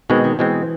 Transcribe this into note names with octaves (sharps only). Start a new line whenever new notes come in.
B2 D#3 G#3 C4
D#3
B2 E3 G#3 C4